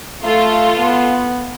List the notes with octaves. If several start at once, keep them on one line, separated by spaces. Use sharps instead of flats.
A3 F4 A4
B3